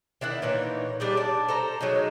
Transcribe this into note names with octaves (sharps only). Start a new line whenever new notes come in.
D#3 D4 E4 F#5
A#2 E3 D#4 C#5
G3 D4 D#4 G#4
D5 A5
A4 C5 A#5
F#3 G#3 A3 D#4